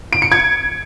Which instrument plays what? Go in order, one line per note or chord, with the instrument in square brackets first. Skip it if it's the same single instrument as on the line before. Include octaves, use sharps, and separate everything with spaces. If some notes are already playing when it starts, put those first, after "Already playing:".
[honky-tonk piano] D7
C#7
G#6